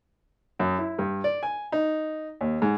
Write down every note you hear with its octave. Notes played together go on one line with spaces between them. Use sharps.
F#2
E4
G2
D5
G#5
D#4
D#2
G#2